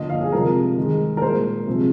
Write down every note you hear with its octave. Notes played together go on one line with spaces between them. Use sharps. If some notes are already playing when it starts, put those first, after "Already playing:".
Already playing: D3 F3 A#3 D#5
F5
G#4
C3 F3 G#3 A#4
D#3 G#3
A#4
A#2 G#3 C5
C3 F3 G#3